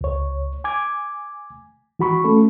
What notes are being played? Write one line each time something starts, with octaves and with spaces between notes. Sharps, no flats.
C#2 C#5
G#5 D6 G#6
E3 F#4 B5 C#6
A3 C#4 A4